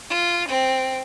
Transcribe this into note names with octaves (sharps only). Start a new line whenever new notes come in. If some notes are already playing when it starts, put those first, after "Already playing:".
F4
C4